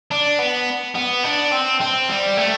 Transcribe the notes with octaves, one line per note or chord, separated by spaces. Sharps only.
D4
B3
B3
D4
C4
C4
G3
A3